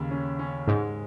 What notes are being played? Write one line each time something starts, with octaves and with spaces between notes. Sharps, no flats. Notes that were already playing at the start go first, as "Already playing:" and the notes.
Already playing: D#2 C#3
C#4
C#4
G#2 G#3